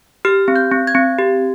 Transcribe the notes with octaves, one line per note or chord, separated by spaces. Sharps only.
G4 F6
C4
G6
C4
G#6
C4
G4